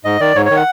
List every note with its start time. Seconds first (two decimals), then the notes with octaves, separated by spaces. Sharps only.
0.05 G#2 D#5
0.20 D#3 D5
0.35 G#2 C#5
0.46 C#5
0.51 D#3
0.56 F#5